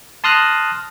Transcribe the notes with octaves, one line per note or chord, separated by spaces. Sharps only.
A5 C6 D#6 F6 F#6 A#6